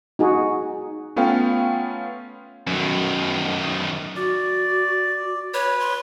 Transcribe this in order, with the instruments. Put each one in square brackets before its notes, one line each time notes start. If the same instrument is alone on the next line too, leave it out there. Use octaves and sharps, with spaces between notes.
[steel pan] D#4 F#4 G#4
[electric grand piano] A3 B3 C#4 F4 F5 G5
[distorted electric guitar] F#2 D#3
[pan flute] F#4 [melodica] D5
[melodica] B4 [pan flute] C#5
[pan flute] C6